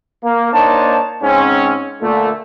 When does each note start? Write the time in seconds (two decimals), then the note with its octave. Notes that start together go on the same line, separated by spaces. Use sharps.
0.23 A#3
0.52 A#3 D4 D#4 C5 C#5 A5
1.23 G#2 C4 C#4
2.01 A#2 D3 A3